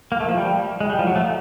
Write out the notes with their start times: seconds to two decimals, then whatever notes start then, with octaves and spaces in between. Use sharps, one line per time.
0.12 A#3
0.20 A3
0.29 F3
0.37 G3
0.80 G#3
0.90 G3
0.99 F3
1.07 F#3
1.16 A3